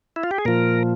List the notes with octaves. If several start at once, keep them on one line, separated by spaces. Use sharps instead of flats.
E4
F4
G4
G#4
A#2 F3 A#4